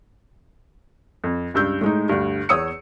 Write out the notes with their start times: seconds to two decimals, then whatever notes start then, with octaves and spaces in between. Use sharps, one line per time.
1.24 F2
1.54 C#2 G2 E6 G6
1.81 A2 G#3 D#4
2.09 D2 G2
2.49 E2 C#5 D#6 E6 C#7